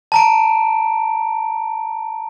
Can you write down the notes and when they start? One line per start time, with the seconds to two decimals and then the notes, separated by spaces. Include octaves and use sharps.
0.12 A5 A#5 D7